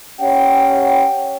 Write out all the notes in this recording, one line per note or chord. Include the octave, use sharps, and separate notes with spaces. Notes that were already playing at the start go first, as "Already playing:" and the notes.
C#4 G4 C#5 F#5 G5